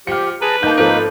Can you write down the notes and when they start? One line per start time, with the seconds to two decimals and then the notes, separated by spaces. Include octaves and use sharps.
0.07 F3 G4 F6 C#7
0.42 G#4 B4 A5 A#5
0.63 A#3 D#4 A5 G6
0.78 G#1 F3 A4 B4